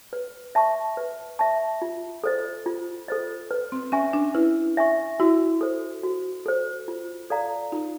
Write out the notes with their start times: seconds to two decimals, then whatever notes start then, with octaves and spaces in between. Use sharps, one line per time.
0.13 B4
0.55 E5 A5 C#6
0.97 B4
1.39 E5 A5 C#6
1.82 F4
2.24 A4 C5 D#5
2.66 F4
3.08 A4 C5 D#5
3.51 B4
3.72 C4
3.92 C#4 E5 G#5 C#6
4.13 D4
4.35 E4 B4
4.77 E5 G#5 C#6
5.20 E4 F#4
5.61 A4 C5
6.03 F#4
6.46 A4 C5
6.88 F4
7.30 A4 D5 F5 A#5
7.72 D#4 F4